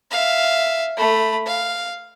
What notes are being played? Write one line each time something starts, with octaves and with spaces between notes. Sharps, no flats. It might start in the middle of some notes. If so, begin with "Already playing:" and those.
E5 F5
A3 B5
F5